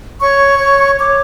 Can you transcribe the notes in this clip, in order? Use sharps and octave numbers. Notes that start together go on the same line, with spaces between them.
C#5 C#6
C#5
C#5 D6